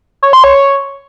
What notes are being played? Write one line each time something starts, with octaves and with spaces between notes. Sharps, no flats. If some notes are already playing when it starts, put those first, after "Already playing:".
C#5
C6
C#5